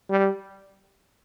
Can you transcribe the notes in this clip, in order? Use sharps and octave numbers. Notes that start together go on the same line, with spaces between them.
G3